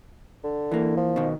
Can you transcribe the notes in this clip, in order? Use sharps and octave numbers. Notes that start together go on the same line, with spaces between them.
D3
E3 A#3
F3
B2 D#3